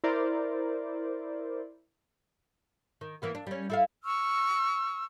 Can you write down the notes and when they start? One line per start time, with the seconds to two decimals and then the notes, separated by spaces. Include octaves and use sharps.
0.04 E4 A#4 C5 D5
3.01 D#3
3.22 E3 A#3 B3
3.35 D4
3.47 G3 C#4
3.70 E4 A4 F5
4.04 C#6 E6 F6